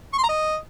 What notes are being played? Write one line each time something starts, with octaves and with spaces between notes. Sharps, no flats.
C#6
C6
A#5
D#5